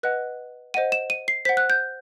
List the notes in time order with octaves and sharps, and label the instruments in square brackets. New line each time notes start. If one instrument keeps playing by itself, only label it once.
[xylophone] B4 D#5 F#5 F#6
C5 D#5 F#5 D#7
E7
D#7
C7
C5 F#5 B6
F#6
G6